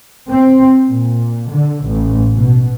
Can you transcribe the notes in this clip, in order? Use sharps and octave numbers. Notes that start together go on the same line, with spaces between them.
C4
A#2
D3
A1
B2